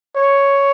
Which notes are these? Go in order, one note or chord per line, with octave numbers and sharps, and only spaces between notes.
C#5